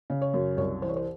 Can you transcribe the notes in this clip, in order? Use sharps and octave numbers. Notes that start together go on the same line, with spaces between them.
C#3
C#5
F#2
C2 C#5
E3 C5
C#5
C5